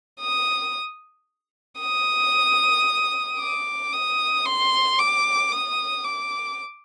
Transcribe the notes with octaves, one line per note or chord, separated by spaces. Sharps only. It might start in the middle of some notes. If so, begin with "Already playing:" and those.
D#6
D#6
D6
D#6
C6
D6
D#6
D6